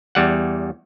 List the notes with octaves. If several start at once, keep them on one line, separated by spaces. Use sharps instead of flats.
E2 G3 F#5